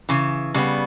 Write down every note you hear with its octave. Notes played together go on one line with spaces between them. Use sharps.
C#3 E3
C#3 G3 B3